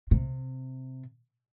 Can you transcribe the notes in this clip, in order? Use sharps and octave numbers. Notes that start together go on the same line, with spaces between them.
C3